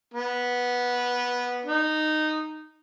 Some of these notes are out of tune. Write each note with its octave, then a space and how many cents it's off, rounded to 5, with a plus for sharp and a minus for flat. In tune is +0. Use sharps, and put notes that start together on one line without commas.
B3 -10
D#4 -10